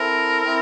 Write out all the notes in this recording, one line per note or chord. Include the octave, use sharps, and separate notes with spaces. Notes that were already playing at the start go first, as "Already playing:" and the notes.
Already playing: C4 E4 A4 A#4
C4 E4